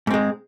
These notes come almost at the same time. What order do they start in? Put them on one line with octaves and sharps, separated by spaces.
G#2 C4 G#3